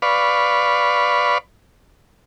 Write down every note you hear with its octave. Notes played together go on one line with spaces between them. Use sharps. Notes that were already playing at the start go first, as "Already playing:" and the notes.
B4 D5 F5 B5 C#6